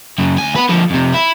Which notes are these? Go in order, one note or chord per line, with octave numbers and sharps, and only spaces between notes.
F#2 C#3
D2 G#5
B3 B4
D3 F3
F2 C3
E4